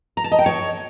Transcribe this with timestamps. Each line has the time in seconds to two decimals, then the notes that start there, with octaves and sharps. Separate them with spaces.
0.17 A#5
0.24 A5
0.32 D#5
0.39 G5
0.46 C#5